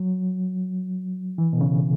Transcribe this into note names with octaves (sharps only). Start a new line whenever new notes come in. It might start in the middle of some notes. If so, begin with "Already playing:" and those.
Already playing: F#3
E3
B2
C#3